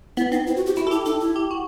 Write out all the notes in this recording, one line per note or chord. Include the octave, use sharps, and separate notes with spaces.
B3 E4
C4 D#4
E4
F#4
G4
E4 F#4
A4
E4 G4
D#4 A4
E4
G4
F#4